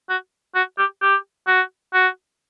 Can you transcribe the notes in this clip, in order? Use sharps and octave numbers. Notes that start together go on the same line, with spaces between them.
F#4
F#4
G4
G4
F#4
F#4